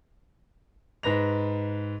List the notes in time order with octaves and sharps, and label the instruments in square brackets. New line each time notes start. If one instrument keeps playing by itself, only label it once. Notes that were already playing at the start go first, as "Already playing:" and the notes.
[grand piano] G#2 B4 A#6 F7